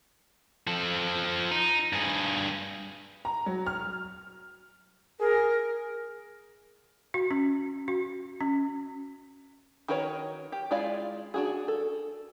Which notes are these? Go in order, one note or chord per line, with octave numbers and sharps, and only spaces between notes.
F3 A4
D#4
G2 G#4
A#5
F#3
F6
G#4 A#4
F#4
C#4
F#4
C#4
D#3 F#4 A#4 B4 C#5
G4
G#3 E4 F4 D5 F5
D4 F#4 G#4
A4